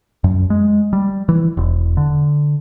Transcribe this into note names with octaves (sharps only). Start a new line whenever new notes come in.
F#2
G#3
G3
E3
E1
D3